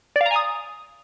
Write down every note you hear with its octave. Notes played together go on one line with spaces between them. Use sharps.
D5
F5
A#5
G#5
D#6